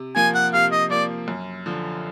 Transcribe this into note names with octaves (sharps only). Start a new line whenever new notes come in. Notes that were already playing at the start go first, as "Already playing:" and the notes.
Already playing: C3
F3 A#3 G#5
F#5
C3 F5
D#5
F3 A#3 D5
F#2
D3 F3